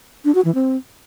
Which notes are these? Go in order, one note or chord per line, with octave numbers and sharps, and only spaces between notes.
D4
F#4
E3
C4